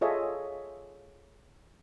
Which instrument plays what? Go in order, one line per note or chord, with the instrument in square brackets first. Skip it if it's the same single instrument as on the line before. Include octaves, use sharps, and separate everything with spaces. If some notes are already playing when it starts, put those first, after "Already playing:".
[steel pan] F4 G#4 A4 C#5 D#5 E5